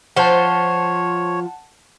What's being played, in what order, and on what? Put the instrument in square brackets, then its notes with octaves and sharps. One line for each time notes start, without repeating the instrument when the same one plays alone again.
[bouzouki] F3 C5 [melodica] C#5 [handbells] F#5 A5